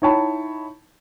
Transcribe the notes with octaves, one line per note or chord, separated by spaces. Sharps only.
D#4 E4 C#5 G5 A5 B5